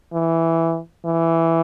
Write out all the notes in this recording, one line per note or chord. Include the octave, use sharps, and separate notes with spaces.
E3
E3